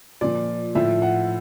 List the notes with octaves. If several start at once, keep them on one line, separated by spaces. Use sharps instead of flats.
A#2 F3 D5
A2 F3 E5
F#5